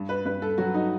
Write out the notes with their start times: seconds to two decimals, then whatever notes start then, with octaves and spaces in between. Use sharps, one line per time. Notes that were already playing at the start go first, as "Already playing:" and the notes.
Already playing: G2
0.09 B4
0.26 G2 B4
0.42 A4
0.58 F#3 F#4
0.74 D#4